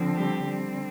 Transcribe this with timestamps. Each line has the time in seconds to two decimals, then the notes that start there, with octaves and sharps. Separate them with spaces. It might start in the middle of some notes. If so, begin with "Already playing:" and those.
Already playing: D3 F3 C4
0.16 G3 G4
0.46 D3 G3 C4